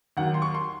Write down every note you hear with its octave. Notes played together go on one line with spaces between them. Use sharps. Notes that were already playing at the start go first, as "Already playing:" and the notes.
D#2 D#3 F#3 F#5
C6
C#6
C6